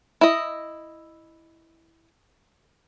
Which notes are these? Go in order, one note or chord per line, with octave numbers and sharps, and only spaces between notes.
E4 D#5